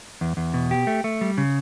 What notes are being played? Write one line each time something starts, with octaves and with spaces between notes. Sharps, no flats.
E2
E2
B2
G4
A3
A3
G3
C#3